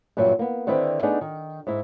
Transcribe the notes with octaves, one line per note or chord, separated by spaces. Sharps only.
G2 A#2 E3 F#3
A#3 B3
D3 D#3 C4 E4 B4 D5
A3 B3 D4 D#4 G#4
D#3
G#2 E4